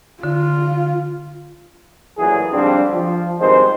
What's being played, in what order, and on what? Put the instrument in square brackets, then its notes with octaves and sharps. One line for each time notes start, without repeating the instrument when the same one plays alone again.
[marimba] D3 [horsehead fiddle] F4
[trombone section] A1 A#2 E3 F#3 G#4
G#2 D3 F3 G3 C4 D4
F3
G2 B2 D#3 G#3 C4 C5